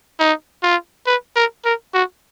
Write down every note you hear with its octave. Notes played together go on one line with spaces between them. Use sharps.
D#4
F4
B4
A#4
A#4
F#4